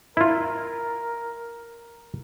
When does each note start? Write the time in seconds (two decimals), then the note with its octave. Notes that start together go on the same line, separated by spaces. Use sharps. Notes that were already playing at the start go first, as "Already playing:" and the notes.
0.17 E4 F4 A#4